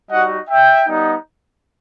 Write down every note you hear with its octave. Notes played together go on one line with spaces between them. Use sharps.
G3 D#4 F#4 D#5 F#5
E5 G5
G3 B3 D#4